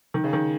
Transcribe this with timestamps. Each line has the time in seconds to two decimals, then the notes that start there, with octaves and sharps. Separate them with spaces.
0.14 D#3
0.24 C#3
0.33 D#3